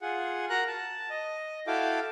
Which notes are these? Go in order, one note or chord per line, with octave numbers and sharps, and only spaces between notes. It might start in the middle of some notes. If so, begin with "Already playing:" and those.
F4 G#4 F#5
F#4 A#4 A#5 F#6
A5
D#5
E4 F#4 A4 F5 G5 D6